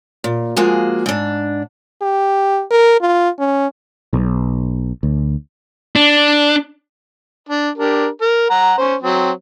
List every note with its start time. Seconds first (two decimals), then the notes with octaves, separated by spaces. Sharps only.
0.24 A#2
0.57 F3 G#3 A#3 F#4 G#4
1.06 G#2 D4
2.02 G4
2.71 A#4
3.01 F4
3.40 C#4
4.13 B1
5.03 D2
5.96 D4
7.49 D4
7.78 D4 G4 A#4
8.21 A#4
8.50 F#5 A#5
8.78 C#4 C5
9.01 F#3 C4